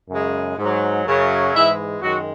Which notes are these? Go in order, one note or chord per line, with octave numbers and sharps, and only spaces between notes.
F#2 C#3 G#3
G#2 F#3
F#2 C#3 F#3
G#2 E3 G#3 E4 E5
F#2 D#3 F#3 G#3 F#4